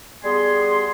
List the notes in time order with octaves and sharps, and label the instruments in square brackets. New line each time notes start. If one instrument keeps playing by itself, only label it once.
[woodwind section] G3 B3 G#4 G#5 C6